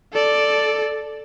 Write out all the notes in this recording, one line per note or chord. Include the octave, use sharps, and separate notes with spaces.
A4 D5